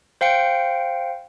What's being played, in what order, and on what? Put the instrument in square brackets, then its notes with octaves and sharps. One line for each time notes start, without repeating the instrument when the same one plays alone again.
[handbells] C5 F5 G5 C#7 D7